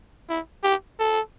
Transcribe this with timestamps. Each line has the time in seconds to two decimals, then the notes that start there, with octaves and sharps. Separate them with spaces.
0.29 E4
0.64 G4
0.99 A4